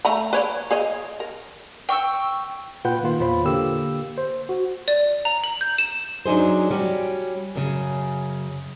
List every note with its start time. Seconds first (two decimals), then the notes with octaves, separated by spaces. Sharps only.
0.05 A3 A#5 B5
0.33 B4 C#5 D5
0.71 G#4 C#5 D#5
1.20 A#4
1.89 G5 C#6 D#6 E6
2.85 A#2 F4 B4 F#5 G5 G6
3.03 D#3 A#3 F4
3.19 E2 A#2 F4 C5 C#5 B5
3.45 D3 A#3 G4 E6
4.18 C5
4.49 F#4
4.88 D5
5.25 A#5
5.44 F#7
5.61 G6
5.78 E7
6.26 F#3 D4 D#4 G#4 C5
6.71 G3 C#4 F#4 G4
7.56 F#2 C#3